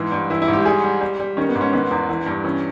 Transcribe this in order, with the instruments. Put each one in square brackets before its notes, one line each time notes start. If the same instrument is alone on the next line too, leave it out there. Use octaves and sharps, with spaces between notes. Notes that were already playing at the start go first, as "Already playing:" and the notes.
Already playing: [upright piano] G#2 E3
G2
E3 E4
E4
G#2
G4
G3 G#4
G3
G3
G3
D#3 C#4
B3
G#2
C#4
D#3 B3
E2
E3
G2
E3 C#4